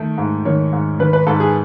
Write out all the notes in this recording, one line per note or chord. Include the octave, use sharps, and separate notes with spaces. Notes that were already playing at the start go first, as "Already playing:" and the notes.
Already playing: D#3 A3
G#2
D#3 C#5
G#2
D#3 B4
B4
G#2 A4
G#4